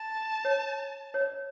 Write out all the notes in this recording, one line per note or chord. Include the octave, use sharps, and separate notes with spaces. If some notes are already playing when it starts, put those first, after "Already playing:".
Already playing: A5
C#5
C#5
D5